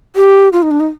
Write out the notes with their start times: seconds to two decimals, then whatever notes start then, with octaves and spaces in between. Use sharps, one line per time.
0.16 G4
0.53 F4
0.62 D#4
0.71 D4
0.80 D#4